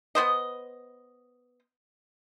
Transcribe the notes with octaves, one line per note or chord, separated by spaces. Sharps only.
B3 C5 D#5